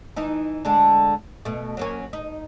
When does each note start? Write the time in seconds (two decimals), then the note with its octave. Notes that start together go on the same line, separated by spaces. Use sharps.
0.16 E3 D#4
0.65 D3 G#3 D4
1.45 B2 A3
1.77 F#3 A#3 C#4
2.13 D#4